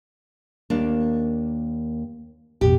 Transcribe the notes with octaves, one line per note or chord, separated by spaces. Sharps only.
D#2 A#3 D4
A1 F2 B2 G4